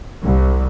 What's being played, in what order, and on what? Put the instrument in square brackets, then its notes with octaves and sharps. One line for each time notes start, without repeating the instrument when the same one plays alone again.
[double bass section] C2